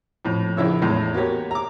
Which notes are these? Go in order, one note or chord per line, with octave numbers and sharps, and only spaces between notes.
F2 A2
A#1 C#3 E4 C#5 E6
E2 A2 G#3
A#3 F#4 G4 C#5
A#5 D6